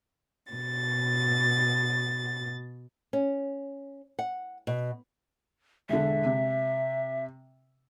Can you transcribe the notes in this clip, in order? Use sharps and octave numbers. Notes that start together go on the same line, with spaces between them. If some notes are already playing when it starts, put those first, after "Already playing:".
B2 A6
C#4
F#5
B2
E1 D3 E5
C3